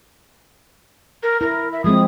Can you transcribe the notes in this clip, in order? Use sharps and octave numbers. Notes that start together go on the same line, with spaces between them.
A#4
E4 A#4
E5
F3 G#3 C4 D#6